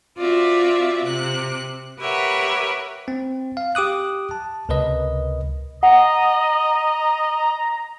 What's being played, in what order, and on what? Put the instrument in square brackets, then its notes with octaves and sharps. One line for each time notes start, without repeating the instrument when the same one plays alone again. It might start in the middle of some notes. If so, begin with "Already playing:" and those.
[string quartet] C4 F4 F#4 D5 E5
C3 F#6
G4 A#4 B4 C#5 E5 F#5
[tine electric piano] C4
F5
G4 D6 D#6 F#6
A5
C#2 C3 A#4 B4 D#5
[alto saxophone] D#5 [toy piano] F#5 [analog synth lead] A#5